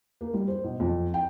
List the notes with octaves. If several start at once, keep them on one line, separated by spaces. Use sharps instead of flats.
A#3
G3
C5
B1
F2
G5